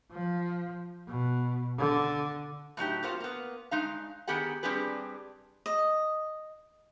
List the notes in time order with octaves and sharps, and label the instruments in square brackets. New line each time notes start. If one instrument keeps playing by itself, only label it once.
[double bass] F3
B2
D3
[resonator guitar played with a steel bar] A2 F#3 D#4 G4
A#3 B3 F4 F#4 C5
A#3 B3
G2 G#3 D#4 F5
D#3 B3 G4 G#4 F#5
G3 C4 D4 G4 G#4 B4
[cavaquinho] D#5